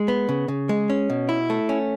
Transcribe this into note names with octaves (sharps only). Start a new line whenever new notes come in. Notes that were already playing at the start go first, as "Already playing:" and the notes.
Already playing: G#3
B3
C#3
C#3
G#3
C#4
B2
E4
A3
C#4